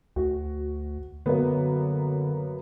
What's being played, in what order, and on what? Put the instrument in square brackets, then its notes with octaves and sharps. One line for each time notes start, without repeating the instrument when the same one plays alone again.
[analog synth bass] D2 [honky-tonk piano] F#4
[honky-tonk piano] F#2 A#3 B3 [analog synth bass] D3